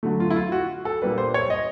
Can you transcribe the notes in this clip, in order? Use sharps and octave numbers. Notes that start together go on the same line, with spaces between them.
D3 F#3 A3
F4
E4
F4
F#4
A4
A#2 G3 A#3 D4 B4
C5
C#5
D#5